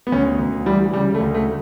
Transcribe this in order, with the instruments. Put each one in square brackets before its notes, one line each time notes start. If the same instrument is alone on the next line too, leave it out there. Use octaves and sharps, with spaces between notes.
[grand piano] B3
D2 C#4
D2
E3 G3
C#3 G3
A3
D2
A3